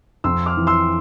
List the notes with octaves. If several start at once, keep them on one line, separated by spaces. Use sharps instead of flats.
F2 C6 E6
D6 F6
E3
C6 E6